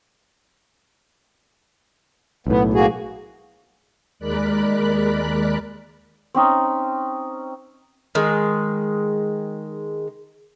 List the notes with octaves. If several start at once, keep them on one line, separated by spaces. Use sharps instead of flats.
B1 A2 B3
A#3 F#4 G#4
D#2 G#3 A#4 D5 B5 F#6
C4 C#4 D#4
D#3 G#3